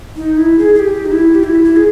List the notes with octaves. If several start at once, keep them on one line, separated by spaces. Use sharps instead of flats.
D#4
E4
G#4
G#4
G4
D#4
E4
G4
E4
E4
G#4